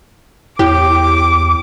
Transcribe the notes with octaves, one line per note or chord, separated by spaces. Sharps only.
E2 E4 G4 D6